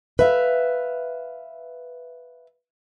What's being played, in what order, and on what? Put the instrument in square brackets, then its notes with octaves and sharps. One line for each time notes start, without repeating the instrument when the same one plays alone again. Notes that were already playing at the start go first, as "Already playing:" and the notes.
[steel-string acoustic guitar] B4 E5 F5